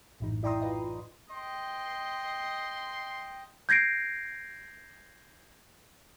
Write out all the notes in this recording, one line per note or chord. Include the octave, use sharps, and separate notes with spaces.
A#1 F#2 A2 E3 D#4
E4 D5 G5 A#5 C6 D#6
F4 B4 D#5
D#5 G5 C6
G6 G#6 A#6 C7 D7